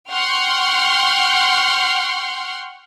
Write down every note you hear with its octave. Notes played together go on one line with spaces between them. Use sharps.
F#5 G5 C6 C#6 F6 G6